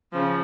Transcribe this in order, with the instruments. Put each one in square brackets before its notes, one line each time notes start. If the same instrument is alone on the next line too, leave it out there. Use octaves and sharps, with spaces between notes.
[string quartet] C#3 F3